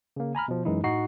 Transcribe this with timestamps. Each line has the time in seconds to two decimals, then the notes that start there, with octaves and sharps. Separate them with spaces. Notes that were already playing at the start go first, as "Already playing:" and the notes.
0.16 C#3 A#3
0.35 G#5 A#5 B5 F6
0.48 B2 F3
0.65 F#2 E3 G#3 D#4 E4
0.83 A2 D#4 F#4 C7